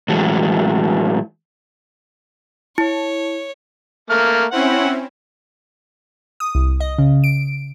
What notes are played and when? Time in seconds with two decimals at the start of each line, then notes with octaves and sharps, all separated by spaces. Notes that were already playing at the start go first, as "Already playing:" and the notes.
0.08 A2 E3 F#3 G#3
2.78 E4 C#5
4.10 A3 A#3 F6
4.52 C4 C#4 E4 F#5
6.40 D#6
6.55 C2
6.80 D#5
6.98 C#3
7.24 D7